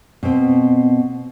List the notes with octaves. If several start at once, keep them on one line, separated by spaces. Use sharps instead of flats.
B2 C4